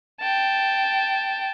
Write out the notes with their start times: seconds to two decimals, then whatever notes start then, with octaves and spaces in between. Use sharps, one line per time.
0.21 G5 A5